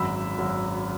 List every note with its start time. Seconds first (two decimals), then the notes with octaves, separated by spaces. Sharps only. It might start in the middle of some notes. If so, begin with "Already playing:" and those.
Already playing: G#1 F#2 F#3 B5 E6
0.39 G#1 F#2 F#3